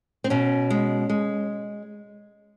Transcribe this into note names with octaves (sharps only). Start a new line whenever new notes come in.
C4
B2 C#4
G#3
G#3